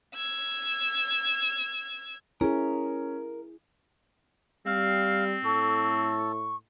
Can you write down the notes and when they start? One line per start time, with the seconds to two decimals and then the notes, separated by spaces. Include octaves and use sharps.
0.15 E6 G#6
2.41 C#4 E4 G#4 A#4
4.66 G3 C4 F5
5.45 A2 A4 C#6